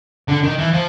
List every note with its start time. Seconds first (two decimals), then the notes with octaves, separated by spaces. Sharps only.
0.28 D3
0.43 D#3
0.58 E3
0.73 F3